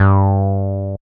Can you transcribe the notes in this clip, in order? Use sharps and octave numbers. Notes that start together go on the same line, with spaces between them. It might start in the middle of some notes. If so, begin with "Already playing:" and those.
Already playing: G2